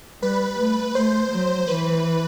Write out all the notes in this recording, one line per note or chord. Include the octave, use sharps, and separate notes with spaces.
G3 B4
A3
A3 C5
F#3
E3 B4